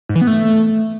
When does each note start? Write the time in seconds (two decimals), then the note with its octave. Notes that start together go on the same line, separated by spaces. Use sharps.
0.09 G#2
0.15 E3
0.21 B3
0.27 A3